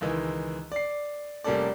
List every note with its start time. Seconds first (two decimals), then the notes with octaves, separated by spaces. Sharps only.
0.01 C#2 D#3 E3 G#3
0.72 D5 C7
1.44 F1 G3 A#3 C#4 A4 D5